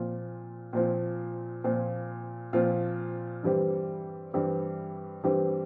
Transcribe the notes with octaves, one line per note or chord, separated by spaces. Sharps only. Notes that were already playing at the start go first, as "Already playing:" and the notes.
Already playing: A#2 F3 C4 F4
A#2 F3 C4 F4
A#2 F3 C4 F4
A#2 F3 C4 F4
G2 E3 G3 C4 G4
G2 E3 G3 C4 G4
G2 E3 G3 C4 G4